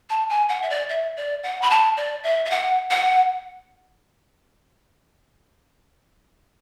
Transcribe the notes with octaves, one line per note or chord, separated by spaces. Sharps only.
A5
G#5
F#5
E5
D5
E5
D5
F#5
B5
A5
D5
E5
E5
F#5
F#5